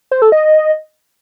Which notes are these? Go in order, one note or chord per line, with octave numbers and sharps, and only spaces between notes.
C5
A4
D#5